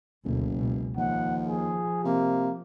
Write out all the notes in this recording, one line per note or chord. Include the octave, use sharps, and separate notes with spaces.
F#1 D2 B2
C#2 B2
D#2 F3 F#5
G#4
C3 A#3